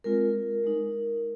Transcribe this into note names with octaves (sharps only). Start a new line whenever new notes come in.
G#3 C4 F4 A#4
G#3 D#4